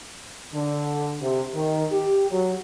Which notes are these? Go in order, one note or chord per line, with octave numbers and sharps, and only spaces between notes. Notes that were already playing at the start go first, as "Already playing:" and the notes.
D3
C3
D#3
G4
F#3